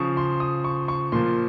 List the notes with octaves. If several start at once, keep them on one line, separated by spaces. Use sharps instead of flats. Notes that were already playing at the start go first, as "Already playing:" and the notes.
Already playing: C#3 F3 C#6 D#6
C6
D#6
C#6
C#6
A#2 F3 C6